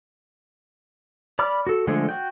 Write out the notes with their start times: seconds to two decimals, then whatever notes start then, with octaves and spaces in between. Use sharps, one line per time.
1.39 D5 B5 D6 F6
1.67 F#4 A4
1.87 D3 F3 G#3 A3 G#4
2.09 F#4 G5